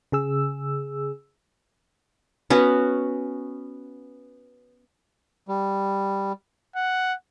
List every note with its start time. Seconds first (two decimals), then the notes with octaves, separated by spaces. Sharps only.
0.12 C#3 G#4 E6
2.50 B3 C#4 F#4
5.48 G3
6.76 F#5